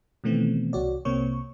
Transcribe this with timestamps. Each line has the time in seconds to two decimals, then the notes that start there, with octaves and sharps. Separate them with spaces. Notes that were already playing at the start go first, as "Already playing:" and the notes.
0.24 B2 D#3 E3 A3 B3 C4
0.73 C2 F#4 C#5 D5
1.05 C2 C3 A#3 C4 C#5 C#6